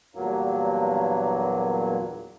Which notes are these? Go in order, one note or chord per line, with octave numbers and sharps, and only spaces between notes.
E2 G2 A#2 F#3 A#3